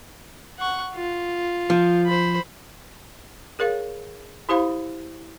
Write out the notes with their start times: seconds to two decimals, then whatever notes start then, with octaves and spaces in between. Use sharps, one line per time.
0.59 F#5 C#6
0.95 F4
1.70 F3
2.07 C5 B5
3.59 G#4 A#4 C#5 F5
4.49 E4 G4 C5 F5 B5